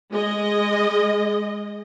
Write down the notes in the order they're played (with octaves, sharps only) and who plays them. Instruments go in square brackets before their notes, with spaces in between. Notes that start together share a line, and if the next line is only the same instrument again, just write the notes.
[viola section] G#3 D#5